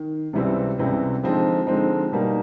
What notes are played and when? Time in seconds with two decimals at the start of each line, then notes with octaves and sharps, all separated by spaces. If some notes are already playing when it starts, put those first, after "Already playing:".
Already playing: D#3
0.33 C#2 C3 E3 G3 C4
0.78 C#2 C3 E3 G3 C4
1.23 D3 F3 G#3 C4 D#4
1.67 D3 F3 G#3 C4 D#4
2.12 B2 G3 A#3 D#4